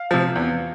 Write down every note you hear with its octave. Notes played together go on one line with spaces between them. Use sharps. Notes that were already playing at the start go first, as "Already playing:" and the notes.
Already playing: F5
C3 F3
E2